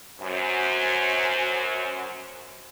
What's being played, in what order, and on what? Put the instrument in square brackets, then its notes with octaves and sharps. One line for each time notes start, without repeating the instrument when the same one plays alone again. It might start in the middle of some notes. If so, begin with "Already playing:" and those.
[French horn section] F#2 [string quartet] F#4 C5 G#5